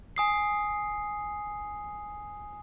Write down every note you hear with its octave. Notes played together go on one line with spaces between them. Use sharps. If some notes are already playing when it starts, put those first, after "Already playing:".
G#5 D#6 C7